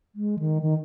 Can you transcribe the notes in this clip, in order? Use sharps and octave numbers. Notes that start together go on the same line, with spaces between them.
G#3
D#3
D#3